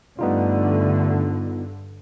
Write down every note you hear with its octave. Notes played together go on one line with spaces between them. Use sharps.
G2 D3 G3 A3 B3 D#4 F4